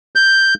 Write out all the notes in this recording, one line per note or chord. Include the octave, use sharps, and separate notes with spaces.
G6